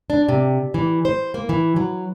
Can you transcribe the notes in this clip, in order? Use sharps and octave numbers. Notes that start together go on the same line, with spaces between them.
D4
C3
E3
C5
A#3
E3
F#3